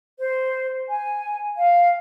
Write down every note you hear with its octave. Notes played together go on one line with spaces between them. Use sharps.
C5
G#5
F5